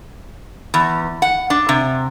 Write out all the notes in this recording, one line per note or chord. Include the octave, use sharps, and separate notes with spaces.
E2
F#5
D4
C3